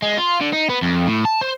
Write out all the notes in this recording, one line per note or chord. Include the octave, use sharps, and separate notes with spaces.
G#3
F4
D3
D#4
B3
F2
A2
A5
C5